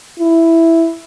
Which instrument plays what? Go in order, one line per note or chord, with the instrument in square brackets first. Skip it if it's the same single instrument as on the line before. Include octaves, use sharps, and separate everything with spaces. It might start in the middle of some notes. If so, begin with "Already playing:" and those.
[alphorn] E4